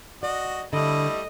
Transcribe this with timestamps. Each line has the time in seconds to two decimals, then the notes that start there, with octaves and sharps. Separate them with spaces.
0.23 F#4 D5 D#5
0.73 D3 G3 A3 E4 D#5